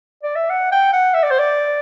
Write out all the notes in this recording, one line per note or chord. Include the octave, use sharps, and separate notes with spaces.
D5
E5
F#5
G5
F#5
E5
D5
C5
D5